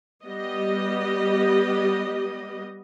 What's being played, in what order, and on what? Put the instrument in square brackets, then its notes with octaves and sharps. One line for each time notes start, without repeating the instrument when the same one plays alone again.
[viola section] G3 B3 G4 D#5